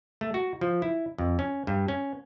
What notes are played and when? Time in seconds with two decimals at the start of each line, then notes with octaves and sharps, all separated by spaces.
0.21 A3
0.34 F#4
0.61 F3
0.82 E4
1.18 F2
1.39 C#4
1.67 G2
1.88 C#4